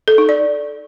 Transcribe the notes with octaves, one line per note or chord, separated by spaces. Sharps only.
A4
D#4
D5